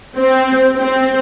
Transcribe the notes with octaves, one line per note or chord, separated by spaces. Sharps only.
C4
C4